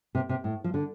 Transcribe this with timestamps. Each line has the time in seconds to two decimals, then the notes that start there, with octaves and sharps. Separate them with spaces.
0.15 C3
0.29 C3
0.44 A2
0.64 F3
0.74 D3